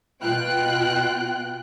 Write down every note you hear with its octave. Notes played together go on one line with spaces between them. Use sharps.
B2 F4 G5 F#6